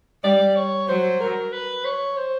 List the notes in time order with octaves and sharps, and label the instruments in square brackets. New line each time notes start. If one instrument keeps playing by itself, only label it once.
[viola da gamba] G3 [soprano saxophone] D5
[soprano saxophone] C#5
[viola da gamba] F#3 [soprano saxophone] C5
[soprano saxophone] A#4
B4
C#5
C5